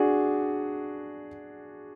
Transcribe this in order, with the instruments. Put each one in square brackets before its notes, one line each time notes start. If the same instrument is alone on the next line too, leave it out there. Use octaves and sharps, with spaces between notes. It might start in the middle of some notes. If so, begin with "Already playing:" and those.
Already playing: [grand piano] D4 F#4 G#4